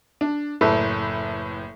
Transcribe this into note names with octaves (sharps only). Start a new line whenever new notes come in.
D4
F#1 A2 E4 A4 B4 E5